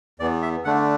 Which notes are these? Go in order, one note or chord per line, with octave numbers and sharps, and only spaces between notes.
E2 E3 B3 D5
E5
D3 A3 D4 F#5